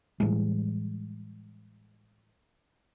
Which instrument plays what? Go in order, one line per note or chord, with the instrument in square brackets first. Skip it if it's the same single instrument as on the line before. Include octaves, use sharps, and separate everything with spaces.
[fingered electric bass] A2 E3 G3 G#3